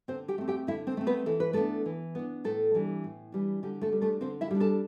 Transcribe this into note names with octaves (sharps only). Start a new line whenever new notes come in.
D3 C4 C5
G4 G5
A3 C4
G4 G5
D3 E4 E5
C4 C5
A3 C4
B3 B4
E3 A4
B4
A3 B3 D4 A4
E3
B3 D4
A2 A3 A4
E3 G3 D4
A2
E3 G3 D4
D3 G3 G4
A3 A4
G3 D4
A3 A4
D3 C4 C5
E4 E5
G3 D4
A4 A5